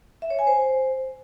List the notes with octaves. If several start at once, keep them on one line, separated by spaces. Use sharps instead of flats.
E5
C#5
G#5
C5